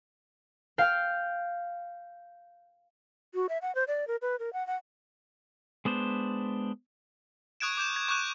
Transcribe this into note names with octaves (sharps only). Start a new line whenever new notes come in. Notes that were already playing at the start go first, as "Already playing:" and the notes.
F5 G5
F#4
E5
F#5
C5
D5
A#4
B4
A#4
F#5
F#5
G#3 B3 D4 C5
C#6 D#6 F#6 G#6 D7 E7
D6 G6 E7
G#6
C#6 D6 F#6 E7